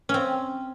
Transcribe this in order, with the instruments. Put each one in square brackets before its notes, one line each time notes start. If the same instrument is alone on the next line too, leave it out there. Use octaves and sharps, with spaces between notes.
[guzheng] C4 C#4